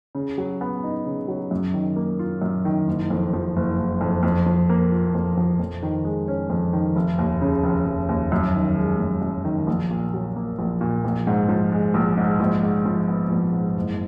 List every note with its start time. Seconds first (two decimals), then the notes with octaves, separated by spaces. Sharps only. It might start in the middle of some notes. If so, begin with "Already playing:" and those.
0.15 C#3
0.38 F#3
0.61 B3
0.84 D#4
1.06 C#3
1.28 F#3
1.51 F#2
1.74 D#3
1.96 A#3
2.19 F4
2.42 F#2
2.65 D#3
2.88 F#1
3.10 F2
3.33 F3
3.56 F#1
3.78 F#1
4.01 F2
4.23 F2
4.46 F3
4.69 A#3
4.92 F4
5.15 F2
5.37 F3
5.60 F2
5.83 D#3
6.05 G#3
6.28 C#4
6.50 F2
6.73 D#3
6.96 F1
7.18 D#2
7.41 C#3
7.63 F1
7.86 F1
8.09 D#2
8.32 F#2
8.55 D#3
8.77 G#3
9.00 F#2
9.22 F#2
9.44 D#3
9.67 A#1
9.91 A#2
10.14 F#3
10.36 A#3
10.59 A#1
10.81 A#2
11.04 A#1
11.27 G#2
11.49 F3
11.72 G#3
11.94 A#1
12.17 G#2
12.40 A#1
12.63 G#2
12.85 F3
13.08 B3
13.30 A#1
13.53 G#2
13.77 F#1